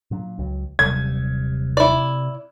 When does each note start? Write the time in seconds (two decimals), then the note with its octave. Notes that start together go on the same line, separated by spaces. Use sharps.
0.11 A#2 F#3 D4
0.39 C#2 F#3
0.79 D#1 C3 F#3 G3 G#6
1.77 E4 D5